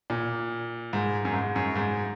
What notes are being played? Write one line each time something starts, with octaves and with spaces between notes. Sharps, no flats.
A#2
G#2
F#2
G#2
F#2
G#2